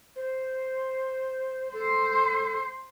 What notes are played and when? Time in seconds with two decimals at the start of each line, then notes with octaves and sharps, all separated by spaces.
0.16 C5
1.73 A4 C5